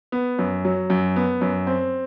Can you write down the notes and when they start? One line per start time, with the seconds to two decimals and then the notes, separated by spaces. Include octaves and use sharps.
0.12 B3
0.39 F#2
0.65 F#3
0.90 F#2
1.16 B3
1.41 F#2
1.67 C4